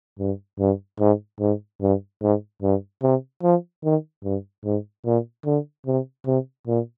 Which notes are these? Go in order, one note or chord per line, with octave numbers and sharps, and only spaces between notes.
G2
G2
G#2
G#2
G2
G#2
G2
C3
F3
D#3
G2
G#2
A#2
D3
C3
C3
A#2